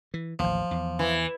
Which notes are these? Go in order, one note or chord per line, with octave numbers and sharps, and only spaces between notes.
E3
A1 D#2 F3
E2
E3